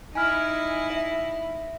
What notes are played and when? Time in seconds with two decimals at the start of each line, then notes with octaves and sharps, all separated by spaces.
0.15 D#4 E4 G#5 F6
0.90 E5